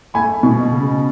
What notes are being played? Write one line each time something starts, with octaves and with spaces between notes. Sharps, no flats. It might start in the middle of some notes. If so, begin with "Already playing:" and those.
A3 G#5 B5
B2
C#3